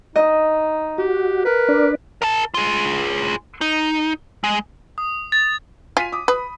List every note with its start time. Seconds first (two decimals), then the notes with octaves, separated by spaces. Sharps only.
0.16 D#4 D#5
0.98 F#4 G4
1.45 A#4 B4
1.69 D4 D5
2.22 A#4 A5
2.54 F4 G#4
3.61 D#4
4.44 G#3
4.98 D#6
5.32 A6
5.97 F4 G#5 B6 D#7
6.12 D6 D#6
6.28 B4 B5 D#6